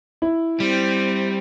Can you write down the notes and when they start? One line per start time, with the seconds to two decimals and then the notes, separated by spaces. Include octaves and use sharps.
0.22 E4
0.60 G3 C4